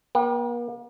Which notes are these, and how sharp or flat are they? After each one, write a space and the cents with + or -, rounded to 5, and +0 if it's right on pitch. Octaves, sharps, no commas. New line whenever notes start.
A#3 +45 G5 -10